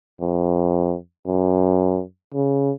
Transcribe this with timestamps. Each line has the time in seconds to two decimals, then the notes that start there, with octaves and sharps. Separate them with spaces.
0.21 F2
1.27 F#2
2.34 C#3